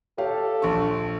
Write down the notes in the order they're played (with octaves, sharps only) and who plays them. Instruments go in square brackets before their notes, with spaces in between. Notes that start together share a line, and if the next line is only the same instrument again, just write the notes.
[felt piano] G4 C#5 F5 [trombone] A4
[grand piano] A#1 C#6 [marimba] D4 A5 C6